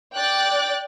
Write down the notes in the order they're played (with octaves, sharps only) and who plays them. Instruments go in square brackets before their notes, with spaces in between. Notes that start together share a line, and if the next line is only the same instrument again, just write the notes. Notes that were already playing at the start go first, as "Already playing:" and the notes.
[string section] D5 G5 D6 F#6 A6